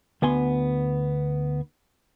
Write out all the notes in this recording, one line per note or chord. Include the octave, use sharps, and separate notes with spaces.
D2 B3 G#5 C6